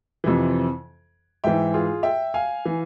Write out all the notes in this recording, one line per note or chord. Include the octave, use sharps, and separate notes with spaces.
F2 C3 E3
G#2 E3 E5 G5
F4 G#4
E5 G5
F5 G#5
E3